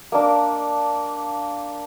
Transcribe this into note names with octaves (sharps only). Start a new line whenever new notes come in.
A#3 D4